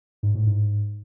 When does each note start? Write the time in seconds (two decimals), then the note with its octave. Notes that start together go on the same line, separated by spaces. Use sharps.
0.23 G#2
0.35 A2
0.47 G#2